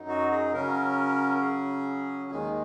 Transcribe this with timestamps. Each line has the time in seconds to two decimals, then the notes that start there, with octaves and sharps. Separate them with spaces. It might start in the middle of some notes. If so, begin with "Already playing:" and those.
Already playing: F#2 F#3 D#4
0.09 F#4
0.31 G#4
0.53 C#3 F#3 C#4 A#4
1.42 G#4
2.31 D#2 D#3 G#3 G#4